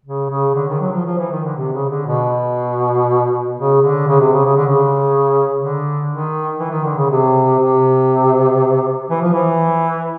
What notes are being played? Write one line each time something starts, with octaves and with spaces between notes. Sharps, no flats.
C#3
C#3
D3
D#3
F#3
F3
F3
E3
D#3
D3
C3
C#3
D3
B2
C#3
D3
C#3
C3
C#3
C#3
D3
C#3
D3
D#3
E3
D#3
D3
C#3
C3
C3
E3
F3
E3